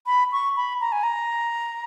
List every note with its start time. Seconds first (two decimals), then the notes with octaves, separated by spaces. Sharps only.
0.06 B5
0.32 C#6
0.56 B5
0.81 A#5
0.92 G#5
1.03 A#5